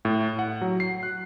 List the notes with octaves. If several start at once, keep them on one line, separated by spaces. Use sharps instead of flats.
A2
F#5
F#3
C7
F#6